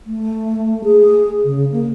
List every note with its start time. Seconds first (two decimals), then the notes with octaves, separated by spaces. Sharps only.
0.07 A3
0.84 G#4
1.45 C#3
1.72 A#3